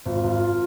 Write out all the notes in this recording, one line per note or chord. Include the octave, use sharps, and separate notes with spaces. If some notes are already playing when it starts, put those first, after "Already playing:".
G#1 F4
G#1